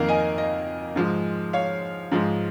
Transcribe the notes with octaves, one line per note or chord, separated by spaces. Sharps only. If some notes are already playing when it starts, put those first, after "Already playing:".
Already playing: F2 D#3 A#3 F5 A#5
D#5 G#5
D#5
G#2 F3 G#3
C#5 F5
G#2 F3 G#3